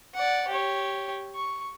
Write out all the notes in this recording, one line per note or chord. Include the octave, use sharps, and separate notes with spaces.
D5 F#5
G4 C#5
C#6